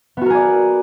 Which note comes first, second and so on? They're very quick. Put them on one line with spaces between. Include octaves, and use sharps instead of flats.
B3 F#4 A#4 G#4 D5